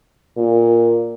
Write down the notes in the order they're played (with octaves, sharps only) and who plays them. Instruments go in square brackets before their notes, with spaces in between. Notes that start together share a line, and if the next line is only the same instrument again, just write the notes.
[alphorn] A#2